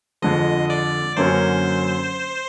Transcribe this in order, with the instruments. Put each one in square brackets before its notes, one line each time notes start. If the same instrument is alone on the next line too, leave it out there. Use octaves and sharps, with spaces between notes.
[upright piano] F2 D3 F3 G#3 [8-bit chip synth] D#5
[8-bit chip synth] D5
[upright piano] F#2 D3 F#3 A#3 C#4 [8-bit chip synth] C5